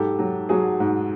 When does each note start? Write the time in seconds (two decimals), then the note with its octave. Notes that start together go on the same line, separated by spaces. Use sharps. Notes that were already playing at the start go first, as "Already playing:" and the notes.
Already playing: G#2 F#3 G4 A4
0.19 F#3
0.49 F#3 F#4 G#4
0.80 G#2